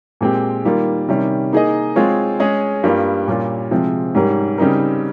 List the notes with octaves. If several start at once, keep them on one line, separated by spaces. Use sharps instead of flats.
A#2 G#3 C4 G4
D#3 G3 A#3 F4
C3 D#3 G3 C#4
A#3 D#4 G#4 D#5
G#3 C4 F4 G#4 C#5
G#3 C#4 G#4 D#5
G2 G3 A#3 F4
A#2 G3 C#4 F4
C3 F3 G#3 C4
G#2 G3 C#4 G4 A#4
C#3 G3 C4 D#4 A#4